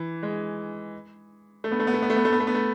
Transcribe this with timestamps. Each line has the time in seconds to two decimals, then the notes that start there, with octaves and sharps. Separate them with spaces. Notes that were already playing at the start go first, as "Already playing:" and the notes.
Already playing: E3
0.23 G#3
1.64 A3
1.72 B3
1.80 A3
1.87 B3
1.94 A3
2.02 B3
2.10 A3
2.17 B3
2.25 A3
2.33 B3
2.40 A3
2.47 B3
2.55 A3